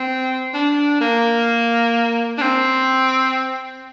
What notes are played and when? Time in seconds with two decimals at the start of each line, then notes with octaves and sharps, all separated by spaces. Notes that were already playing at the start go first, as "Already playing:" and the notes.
Already playing: C4
0.54 D4
1.01 A#3
2.38 D4
2.41 C4